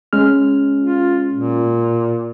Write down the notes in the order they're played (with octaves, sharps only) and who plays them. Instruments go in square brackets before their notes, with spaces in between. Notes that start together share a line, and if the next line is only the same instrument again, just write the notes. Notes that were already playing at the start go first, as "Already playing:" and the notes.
[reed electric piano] G#3 C#4 F6
[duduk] F4
A#2